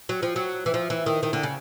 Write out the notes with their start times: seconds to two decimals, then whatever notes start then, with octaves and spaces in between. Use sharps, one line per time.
0.09 F#3
0.23 F3
0.36 F#3
0.66 E3
0.74 F3
0.90 E3
1.06 D#3
1.23 D#3
1.33 D3
1.43 C#3